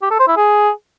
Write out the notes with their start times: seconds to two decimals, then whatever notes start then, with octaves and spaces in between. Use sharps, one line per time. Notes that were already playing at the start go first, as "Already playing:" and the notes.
0.02 G4
0.11 A4
0.19 C5
0.28 E4
0.37 G#4